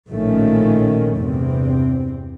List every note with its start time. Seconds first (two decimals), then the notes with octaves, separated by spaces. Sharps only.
0.11 A#1 A2 D#3 F3 A3 C#4
1.17 E2 G2 C3 C4